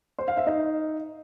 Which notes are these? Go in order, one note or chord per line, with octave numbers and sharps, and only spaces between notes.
C5
F5
E5
D#4